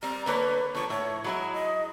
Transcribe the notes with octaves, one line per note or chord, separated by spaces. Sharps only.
G3 C4 A#5
D3 A#3 B4 C#5
D3 F3 C#6
A2 C#5
F#3 G#3 E4 B5
D#5